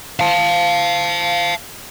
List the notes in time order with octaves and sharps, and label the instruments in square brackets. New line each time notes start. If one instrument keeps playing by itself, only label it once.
[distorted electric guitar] F5 A5